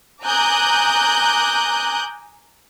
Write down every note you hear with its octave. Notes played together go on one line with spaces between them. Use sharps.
G#5 A#5 D6 D#6 F#6 G6